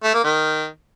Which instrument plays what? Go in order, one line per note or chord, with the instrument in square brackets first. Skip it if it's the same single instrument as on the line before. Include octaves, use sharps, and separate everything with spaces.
[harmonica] A3
A#3
D#3